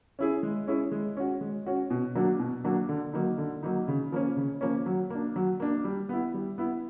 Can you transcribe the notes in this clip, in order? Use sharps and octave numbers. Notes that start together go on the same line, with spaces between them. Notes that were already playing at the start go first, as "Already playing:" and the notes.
C#4 E4 G#4
G#3
C#4 E4 G#4
G#3
C#4 F#4
G#3
C#4 F#4
B2
F#3 A#3 D4 F#4
B2
F#3 A#3 D4 F#4
D3
F#3 A#3 D#4
D3
F#3 A#3 D#4
C#3
F3 A#3 C#4
C#3
F3 A#3 C#4
F#3
A#3 D4
F#3
A#3 D4
G3
B3 E4
G3
B3 E4